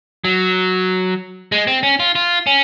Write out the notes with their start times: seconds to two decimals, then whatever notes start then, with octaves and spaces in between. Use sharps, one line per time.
0.24 F#3
1.52 G#3
1.67 C4
1.83 C#4
2.00 F4
2.15 F4
2.47 C#4